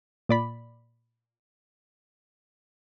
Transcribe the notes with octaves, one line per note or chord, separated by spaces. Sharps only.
A#2 D5 B5